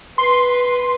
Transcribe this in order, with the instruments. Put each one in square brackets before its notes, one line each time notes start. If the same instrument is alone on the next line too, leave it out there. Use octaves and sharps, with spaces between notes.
[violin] B4 [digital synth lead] C6